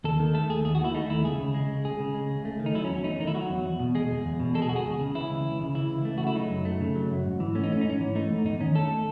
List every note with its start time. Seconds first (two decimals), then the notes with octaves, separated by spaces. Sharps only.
0.04 D#2 A4
0.20 D#3
0.34 A3 A4
0.49 D#2 G#4
0.65 D#2 G#4
0.75 F#4
0.79 D#3
0.84 E4
0.95 A3 D#4
1.10 D#2 E4
1.25 C#2 G#4
1.40 C#3
1.54 G#3
1.70 C#2
1.84 C#2 G#4
2.00 C#3
2.15 G#3
2.30 C#2
2.45 A3
2.60 D#3
2.66 D#4
2.75 F#3 E4
2.85 C#4
2.90 E2
2.95 C#4
3.04 A3 D#4
3.20 D#3 D#4
3.27 E4
3.35 F#3 F#4
3.50 E2
3.65 E2
3.80 B2
3.95 G#3 G#4
4.10 E2
4.25 E2
4.40 B2
4.55 G#3 A4
4.62 G#4
4.69 E2 F#4
4.76 G#4
4.85 C#2
5.00 C#3
5.15 E3 E4
5.30 C#2
5.45 C#2
5.60 C#3
5.75 E3 E4
5.90 C#2
6.05 A3
6.18 C#3 F#4
6.27 E4
6.35 F#3 D#4
6.50 F#2
6.65 A3
6.80 C#3
6.95 F#3
7.11 F#2
7.26 G#2
7.40 E3
7.55 A3 C#4
7.64 D#4
7.70 G#2 C#4
7.81 D#4
7.86 G#2 C#4
8.01 E3
8.15 A3 D#4
8.31 G#2
8.46 E2 D#4
8.61 D#3 C#4
8.75 A3 A4